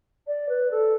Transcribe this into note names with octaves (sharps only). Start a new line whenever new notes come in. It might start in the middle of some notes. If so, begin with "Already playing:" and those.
D5
B4
A4